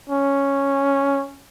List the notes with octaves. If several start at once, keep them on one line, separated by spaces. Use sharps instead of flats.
C#4